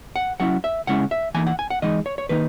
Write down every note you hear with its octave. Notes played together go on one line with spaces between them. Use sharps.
F#5
F#3 C#4 E4 F#5
E5
C#3 G#3 C#4 E4 F#5
E5
E3 A#3 D#4 G#5
F#5
G#5
F#5
E3 G#3 D#4 D#5
C#5
C#5
D#3 A#3 D#4 B4